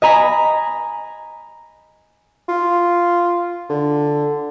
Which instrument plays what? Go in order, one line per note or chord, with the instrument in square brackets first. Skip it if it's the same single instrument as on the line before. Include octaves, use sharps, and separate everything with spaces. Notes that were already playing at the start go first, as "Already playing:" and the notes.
[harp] D#5 G#5 A#5 B5
[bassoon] F4
D3